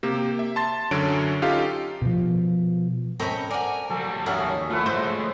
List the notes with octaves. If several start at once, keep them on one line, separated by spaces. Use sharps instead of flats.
C3 A#3 G4
E5
A5 C6 A6
F#2 D3 F#3 C#4 D7
C#4 D#4 F4 G4 A4 F5
B2 F3
C4 C#4 A4 A#4 C#5 D#5 B5
F#4 A#4 D5 G#5
F#3 G3 A4 F5
D#2 C#4 F#4 A#4 C#5 D#5 E5
F3 A3 E4 B4
G#3 A3 C5